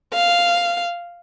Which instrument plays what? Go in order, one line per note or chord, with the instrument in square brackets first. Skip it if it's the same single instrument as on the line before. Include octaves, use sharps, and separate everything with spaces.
[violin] F5